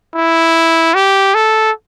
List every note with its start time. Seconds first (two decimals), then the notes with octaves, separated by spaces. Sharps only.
0.15 E4
0.94 G4
1.34 A4